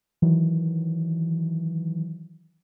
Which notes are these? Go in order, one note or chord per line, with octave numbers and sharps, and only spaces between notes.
D#3 E3 F#3